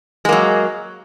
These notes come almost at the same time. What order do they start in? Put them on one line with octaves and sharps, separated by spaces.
G#3 A#3 F#3